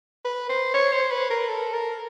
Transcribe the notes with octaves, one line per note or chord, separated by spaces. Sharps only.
B4
C5
C#5
C5
B4
A#4
A4
A#4